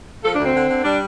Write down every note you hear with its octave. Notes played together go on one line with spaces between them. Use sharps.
F3 A4
D4
D2
C4
D3
D3
G3 D4